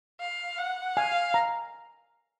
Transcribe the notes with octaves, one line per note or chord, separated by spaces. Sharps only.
F5
F#5
F5 G#5
A#5